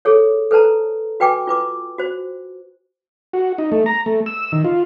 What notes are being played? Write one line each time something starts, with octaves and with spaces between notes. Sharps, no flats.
G#4 A4 C#5
A4 B4 C5 A5 A#5
F#4 B4 G5 G#5 D6
F4 B4 D6
F#4 C5
F#4
D#4
A3
A#5
A3
E6
D#3
F4